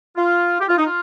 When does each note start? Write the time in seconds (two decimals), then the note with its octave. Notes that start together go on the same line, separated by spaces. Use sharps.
0.17 F4
0.61 G4
0.69 F4
0.78 D#4
0.86 F4